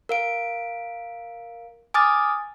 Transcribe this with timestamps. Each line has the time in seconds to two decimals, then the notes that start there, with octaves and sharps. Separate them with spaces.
0.09 A#4 F5 D7
1.94 G#5 D6 D#6 F6 A6